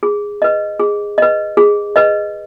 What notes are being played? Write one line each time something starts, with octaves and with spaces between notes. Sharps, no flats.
G#4
B4 D#5
G#4
B4 D#5
G#4
B4 D#5